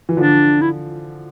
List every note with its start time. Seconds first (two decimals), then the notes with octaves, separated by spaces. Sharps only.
0.09 E3
0.17 D3 F3 D4
0.62 E4